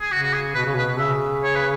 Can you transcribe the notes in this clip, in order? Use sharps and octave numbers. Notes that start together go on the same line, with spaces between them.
G#4
C#3 F#4
F#4
G#4
B2 B4
C#3
B2 B4
C#3 E5
C#5
B4